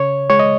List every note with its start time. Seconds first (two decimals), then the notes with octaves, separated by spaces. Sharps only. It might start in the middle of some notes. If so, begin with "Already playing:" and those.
Already playing: C#3 C#5
0.30 G#3 C#5
0.39 D#5